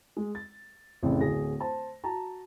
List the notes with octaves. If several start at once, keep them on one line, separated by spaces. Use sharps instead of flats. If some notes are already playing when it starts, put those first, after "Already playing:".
G#3
A6
A1 F2 C#3
D1 G#4 A#6
C5 A5
F#4 A5 A#5